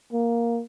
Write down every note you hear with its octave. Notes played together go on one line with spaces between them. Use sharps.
A#3